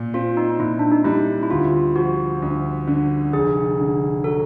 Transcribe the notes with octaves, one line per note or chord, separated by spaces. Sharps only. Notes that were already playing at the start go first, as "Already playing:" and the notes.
Already playing: A#2
C4 F4
D#4
A#2 E4
D4
D#4
G3 E4
E4
D2 F4
F3 F#4
D2
D3
F1 G#4
D3
F#3 A4